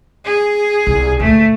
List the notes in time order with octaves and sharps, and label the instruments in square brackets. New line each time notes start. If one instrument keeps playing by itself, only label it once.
[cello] G#4
[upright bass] C2
[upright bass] D2 A#2 [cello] A3